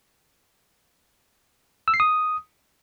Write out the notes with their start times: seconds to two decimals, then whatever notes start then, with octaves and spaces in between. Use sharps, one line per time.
1.88 E6
1.94 C7
2.00 D#6